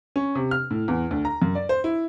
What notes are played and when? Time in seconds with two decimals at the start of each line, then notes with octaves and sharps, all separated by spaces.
0.16 C#4
0.35 C3
0.51 F6
0.71 A2
0.88 E2
1.11 D2
1.25 A#5
1.42 F#2
1.55 D5
1.69 C5
1.84 E4